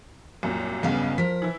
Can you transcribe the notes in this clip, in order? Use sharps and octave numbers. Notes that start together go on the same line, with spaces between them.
C2 F#2 A#2
B1 E2 G2 C#3 B3 F5
F3 A#4 B6
E3 E4